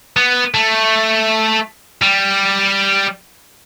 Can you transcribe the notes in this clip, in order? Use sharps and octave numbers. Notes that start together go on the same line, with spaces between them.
B3
A3
G3